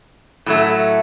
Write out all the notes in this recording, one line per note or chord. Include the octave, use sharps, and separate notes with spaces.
A2 F#3 A3